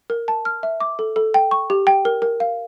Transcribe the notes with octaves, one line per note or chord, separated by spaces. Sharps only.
A#4
A5
F6
E5
D6
A4
A4
G5
C#6
G4
G5
A#4
A#4
F5